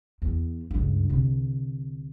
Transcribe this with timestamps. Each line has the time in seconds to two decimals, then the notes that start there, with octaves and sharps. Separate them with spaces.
0.22 E2
0.71 C#2 G2
1.09 C2 D3